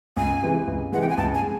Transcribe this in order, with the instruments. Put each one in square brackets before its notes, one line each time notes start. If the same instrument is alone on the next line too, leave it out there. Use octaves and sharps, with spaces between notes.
[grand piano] C#2 [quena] G#5
[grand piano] C3 E3 G#3
C#2
[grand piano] C3 E3 G#3 [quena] F#5
[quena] G5
G#5
[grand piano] C#2 [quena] A5
[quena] G#5
[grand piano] G#3